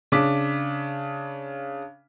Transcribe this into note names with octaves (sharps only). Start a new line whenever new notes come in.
C#3 D4 D6 B6